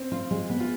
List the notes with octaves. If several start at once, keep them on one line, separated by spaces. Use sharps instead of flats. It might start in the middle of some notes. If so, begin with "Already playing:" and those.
Already playing: C4
F4
G#3
B3
F4